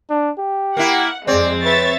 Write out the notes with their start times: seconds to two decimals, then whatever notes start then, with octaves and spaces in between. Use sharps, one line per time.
0.10 D4
0.39 G4
0.77 A#3 E4 F#5
1.27 F2 G#3 C4 D5
1.65 B4 C#5 E5 A6